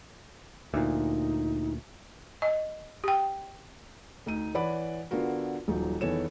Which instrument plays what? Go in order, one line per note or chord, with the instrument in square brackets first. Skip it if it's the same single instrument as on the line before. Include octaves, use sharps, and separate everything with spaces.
[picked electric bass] D2 A#2 [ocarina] D#4
[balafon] D#5
G4 G5
[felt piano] D2 D#4 D#7
E3 C#5 D5 F#5 B5
D3 B3 F4 F#4 A#4
D#1 F3 F#3 D#4
E2 D#3 E3 A4 C#5 E7